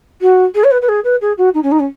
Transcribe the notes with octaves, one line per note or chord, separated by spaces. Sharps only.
F#4
G#4
C#5
B4
B4
G#4
B4
G#4
F#4
D#4
C#4
D#4
C#4